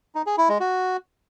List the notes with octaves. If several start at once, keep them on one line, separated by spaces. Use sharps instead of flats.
D#4
G#4
E4
G#3
F#4